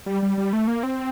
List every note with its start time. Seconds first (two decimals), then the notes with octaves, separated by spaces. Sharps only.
0.06 G3
0.22 G3
0.38 G3
0.53 A3
0.67 A#3
0.83 C4